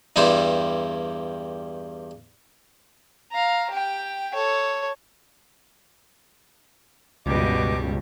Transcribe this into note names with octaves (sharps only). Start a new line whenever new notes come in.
E2 G2 G3 E4 C5
F5 A#5
G4 G5
A4 C#5
C#2 G2 B2 G3 B4 D#5 D6